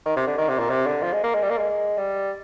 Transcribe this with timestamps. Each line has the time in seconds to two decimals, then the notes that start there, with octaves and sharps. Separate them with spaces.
0.06 D#3
0.16 C3
0.27 D3
0.37 D#3
0.48 C3
0.59 A#2
0.69 C3
0.86 D3
1.02 F3
1.12 G#3
1.23 A#3
1.34 G#3
1.42 G3
1.50 A#3
1.58 G#3
1.97 G3